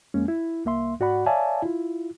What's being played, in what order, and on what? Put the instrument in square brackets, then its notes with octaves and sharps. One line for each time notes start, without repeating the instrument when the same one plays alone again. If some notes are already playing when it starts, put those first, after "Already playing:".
[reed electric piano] F2 G#3 A#3 C#4
E4
C2 A#3 E5 C6
G#2 F#4 D5 F#5 B5
C#5 D5 E5 F5 G#5 A5
E4 F4